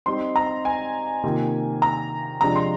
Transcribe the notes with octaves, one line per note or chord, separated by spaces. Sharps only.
G3 C4 D#4 C6
A#5
G#5
C3 D#3 A#3 F4
A#5
C3 F3 G#3 D4 F4 A#5
C6